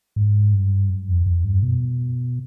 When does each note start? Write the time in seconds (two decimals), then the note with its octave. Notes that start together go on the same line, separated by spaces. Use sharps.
0.16 G#2
0.53 G2
0.90 F#2
1.08 F2
1.26 F2
1.45 G2
1.63 B2